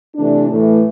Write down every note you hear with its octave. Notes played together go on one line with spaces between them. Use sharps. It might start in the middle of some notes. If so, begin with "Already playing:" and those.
C3 E3 A3 D4
A2 E3 A3